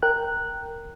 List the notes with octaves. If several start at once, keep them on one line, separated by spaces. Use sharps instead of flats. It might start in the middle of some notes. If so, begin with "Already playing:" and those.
A#4 G5 F#6